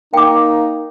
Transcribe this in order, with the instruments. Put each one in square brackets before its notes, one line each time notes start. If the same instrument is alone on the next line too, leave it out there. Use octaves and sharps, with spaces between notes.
[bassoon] A#3 [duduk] D#4 [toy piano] G5 D6